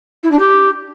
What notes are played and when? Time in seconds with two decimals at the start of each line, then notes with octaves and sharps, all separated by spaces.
0.23 E4
0.31 D4
0.39 G4